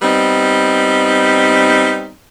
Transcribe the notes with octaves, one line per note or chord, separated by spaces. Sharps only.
G3 B3 C4 D#4